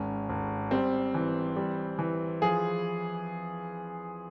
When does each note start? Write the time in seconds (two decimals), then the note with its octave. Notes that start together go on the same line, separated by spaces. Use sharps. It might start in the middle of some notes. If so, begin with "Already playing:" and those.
Already playing: G#1 C#4
0.29 G#1
0.71 G3 C4
1.15 E3
1.56 G3
1.99 E3
2.42 F3 G#4